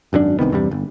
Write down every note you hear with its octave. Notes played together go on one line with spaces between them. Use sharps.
G#1 F#2 B2 D4
C2 C3 D#3 B3
E2 G2 C3 G3
G1